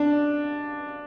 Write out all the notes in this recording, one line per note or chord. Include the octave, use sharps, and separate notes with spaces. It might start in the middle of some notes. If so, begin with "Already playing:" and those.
Already playing: D4